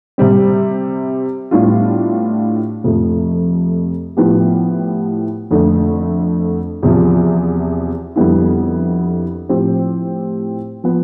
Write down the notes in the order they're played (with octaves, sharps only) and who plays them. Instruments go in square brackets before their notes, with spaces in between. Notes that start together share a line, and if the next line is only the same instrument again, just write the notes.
[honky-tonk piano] C3 G3 C4
A2 G3 B3 D4 F4
F2 C3 F3 A3
A2 F3 B3 E4 G4
F2 D3 A3
E2 C3 F3
F2 D3 G3 B3 E4
A2 F3 C4 G4
F3 B3